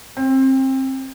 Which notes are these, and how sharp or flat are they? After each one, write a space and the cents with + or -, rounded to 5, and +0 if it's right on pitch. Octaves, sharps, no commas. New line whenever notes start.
C4 +25